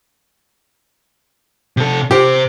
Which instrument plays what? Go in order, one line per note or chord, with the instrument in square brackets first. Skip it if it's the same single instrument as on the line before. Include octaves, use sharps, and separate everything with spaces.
[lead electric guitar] C3 A4
[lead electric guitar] C3 C5 [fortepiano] G4